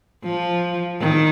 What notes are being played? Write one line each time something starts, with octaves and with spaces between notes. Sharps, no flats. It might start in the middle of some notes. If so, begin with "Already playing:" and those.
F3
D#3